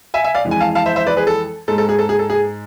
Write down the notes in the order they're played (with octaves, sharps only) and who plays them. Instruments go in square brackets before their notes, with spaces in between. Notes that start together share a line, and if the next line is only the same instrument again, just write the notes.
[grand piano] E5 G#5
E5 G#5
D5 F5
F2 E3 G#3
G#5
F5 A5
F5 A5
C5 E5
C5 E5
B4 D5
G#4 B4
A4
G#2 G#3 A4
A4
G#4
A4
G#4
A4
G#4